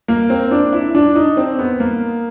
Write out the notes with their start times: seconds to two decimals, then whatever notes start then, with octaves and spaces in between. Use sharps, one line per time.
0.08 A#3
0.30 C4
0.51 D4
0.73 E4
0.95 D4
1.16 D#4
1.37 C4
1.59 B3
1.80 A#3